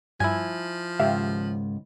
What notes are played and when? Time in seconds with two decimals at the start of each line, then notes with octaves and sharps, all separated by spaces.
0.20 G2 F3 E4 G#5
0.99 C#2 G#2 D#3 G4 E5 F5